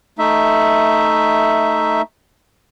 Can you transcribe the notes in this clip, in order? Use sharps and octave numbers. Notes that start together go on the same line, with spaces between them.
A3 D#4 E5